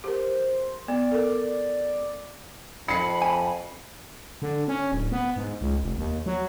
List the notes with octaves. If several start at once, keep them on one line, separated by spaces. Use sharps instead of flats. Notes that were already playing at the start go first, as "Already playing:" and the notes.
G4 A#4 C5
B3 D5
A4 A#4
F2 B5 C7 C#7
G#5
D3
C#4
D1
B3
G#2
C#2
F1
D#2
F#3